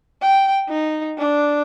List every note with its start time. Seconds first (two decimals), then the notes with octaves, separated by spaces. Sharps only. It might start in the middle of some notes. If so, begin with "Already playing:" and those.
0.22 G5
0.69 D#4
1.18 D4